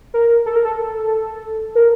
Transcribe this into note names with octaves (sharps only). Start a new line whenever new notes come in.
A#4
A4
A#4
A4
A#4